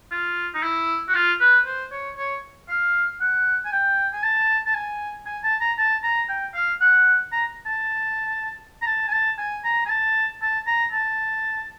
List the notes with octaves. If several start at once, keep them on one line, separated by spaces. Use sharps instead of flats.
F4
D#4
E4
F#4
F4
B4
C5
C#5
C#5
F5
F#5
G#5
G5
G#5
A5
A5
G#5
G#5
A5
A#5
A5
A#5
G5
F5
F#5
A#5
A5
A#5
A5
G#5
A5
G#5
A#5
G#5
A5
A5
A#5
A5